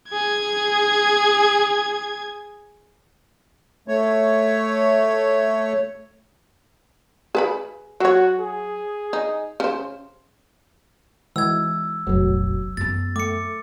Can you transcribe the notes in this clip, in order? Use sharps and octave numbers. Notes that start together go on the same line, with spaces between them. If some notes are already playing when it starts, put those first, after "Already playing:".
G#4 G#6
A3 C#5
G#4 B4 B5
F#3 F#4 C#5
G#4
D#4
C#3 C5
E3 G#3 E6 G#6
F1 A#1 F#3
F#2 B3 A6
A3 D6 C#7